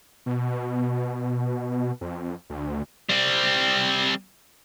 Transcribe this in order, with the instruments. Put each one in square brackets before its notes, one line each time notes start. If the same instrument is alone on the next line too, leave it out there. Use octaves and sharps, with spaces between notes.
[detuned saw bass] B2
F2
D2
[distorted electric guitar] G3 C4